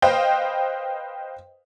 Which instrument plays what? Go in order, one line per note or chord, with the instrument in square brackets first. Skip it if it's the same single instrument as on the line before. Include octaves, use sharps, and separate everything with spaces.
[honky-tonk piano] B4 C5 D#5 F5 G5